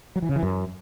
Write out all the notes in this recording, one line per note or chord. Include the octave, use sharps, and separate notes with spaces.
F#3
E3
C#3
E3
F#2